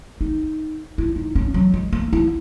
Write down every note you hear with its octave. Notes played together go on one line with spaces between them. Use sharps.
D#4
E4
D#4
C#4
F#3
G#3
A#3
E4